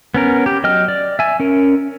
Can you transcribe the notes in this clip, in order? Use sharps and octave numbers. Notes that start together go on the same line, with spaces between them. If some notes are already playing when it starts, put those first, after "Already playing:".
B3 C#4 A#4
G4
F#3 D#5 G5 F6
D5
E5 G#5
C#4 A#4